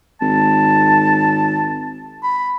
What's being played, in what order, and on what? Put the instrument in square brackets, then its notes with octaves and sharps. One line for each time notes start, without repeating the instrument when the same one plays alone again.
[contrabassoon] G#1 [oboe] A5
[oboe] B5